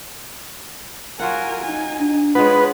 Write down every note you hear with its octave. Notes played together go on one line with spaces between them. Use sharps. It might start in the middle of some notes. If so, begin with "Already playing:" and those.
F#3 F4 A#4 F#5 G#5
D#4 G#5
D4
G#3 B3 F4 B4 C#5